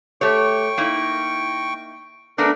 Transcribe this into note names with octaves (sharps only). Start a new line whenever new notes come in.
A3 G4 C#5 G5 C#6
A#3 D#4 E4
A3 B3 D4 A#4